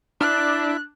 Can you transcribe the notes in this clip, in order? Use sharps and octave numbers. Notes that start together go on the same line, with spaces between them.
D4 E4 F#6